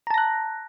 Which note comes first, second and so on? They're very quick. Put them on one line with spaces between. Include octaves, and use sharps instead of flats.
A#5 A5 A#6 F#6